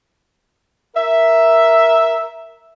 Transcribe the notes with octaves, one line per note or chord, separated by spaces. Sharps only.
A#4 E5